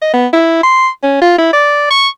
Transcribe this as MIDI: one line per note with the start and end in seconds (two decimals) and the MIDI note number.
0.02 0.09 75
0.13 0.27 59
0.33 0.60 64
0.63 0.88 84
1.03 1.19 61
1.21 1.35 65
1.38 1.52 64
1.53 1.89 74
1.90 2.08 85